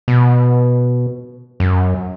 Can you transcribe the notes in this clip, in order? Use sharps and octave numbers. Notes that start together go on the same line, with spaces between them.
B2
F#2